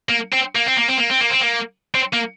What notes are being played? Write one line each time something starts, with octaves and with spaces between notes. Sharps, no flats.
A#3
C4
A#3
C4
A#3
C4
A#3
C4
A#3
C4
A#3
C4
A#3